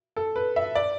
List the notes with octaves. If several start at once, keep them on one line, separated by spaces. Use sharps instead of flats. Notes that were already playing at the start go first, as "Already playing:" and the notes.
A4
B4
E5
D5